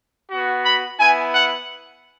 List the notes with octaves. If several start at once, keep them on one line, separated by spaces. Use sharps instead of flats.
B3 F#4
B5
B3 E4 G#5
F#5